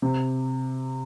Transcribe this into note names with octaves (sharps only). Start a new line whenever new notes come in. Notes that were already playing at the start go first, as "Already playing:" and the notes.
C3